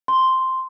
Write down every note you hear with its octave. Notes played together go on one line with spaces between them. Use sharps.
C6